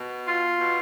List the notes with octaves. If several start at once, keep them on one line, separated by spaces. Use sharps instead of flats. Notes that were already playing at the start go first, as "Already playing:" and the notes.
Already playing: B2
F4
B2